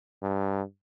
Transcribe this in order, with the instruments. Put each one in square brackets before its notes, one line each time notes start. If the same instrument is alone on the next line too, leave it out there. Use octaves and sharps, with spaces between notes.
[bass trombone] G2